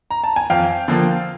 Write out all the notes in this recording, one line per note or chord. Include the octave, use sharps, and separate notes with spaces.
A#5
A5
G#5
F2 F5 G5
D3 F3 A#3